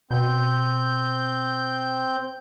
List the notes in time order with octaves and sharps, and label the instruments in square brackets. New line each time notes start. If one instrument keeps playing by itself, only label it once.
[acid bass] B2 [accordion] C4 G6